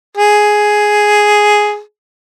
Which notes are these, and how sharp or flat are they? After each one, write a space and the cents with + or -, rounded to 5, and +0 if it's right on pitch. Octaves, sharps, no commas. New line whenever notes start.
G#4 +5